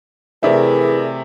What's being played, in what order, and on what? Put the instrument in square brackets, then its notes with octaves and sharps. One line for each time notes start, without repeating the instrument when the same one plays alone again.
[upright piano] C3 A3 [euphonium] E3 [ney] G#4 [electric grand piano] A#4 D5 E5